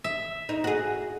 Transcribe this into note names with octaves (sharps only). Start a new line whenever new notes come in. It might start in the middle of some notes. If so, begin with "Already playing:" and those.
E5
D#4
F#4 G#4